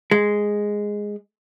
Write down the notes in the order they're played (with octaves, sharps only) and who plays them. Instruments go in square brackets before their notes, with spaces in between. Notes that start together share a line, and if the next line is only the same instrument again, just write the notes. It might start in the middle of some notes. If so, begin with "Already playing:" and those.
[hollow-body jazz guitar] G#3